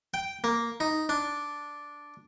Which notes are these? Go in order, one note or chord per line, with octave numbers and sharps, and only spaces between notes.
G5
A#3
D#4
D4